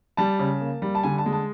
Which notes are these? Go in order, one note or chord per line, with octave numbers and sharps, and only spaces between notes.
G3 A5
C#3
A#3
G3
A5
D3 G#5
A5
G#3
A5